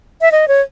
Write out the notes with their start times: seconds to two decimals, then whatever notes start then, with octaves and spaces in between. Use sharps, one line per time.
0.21 E5
0.32 D#5
0.48 C#5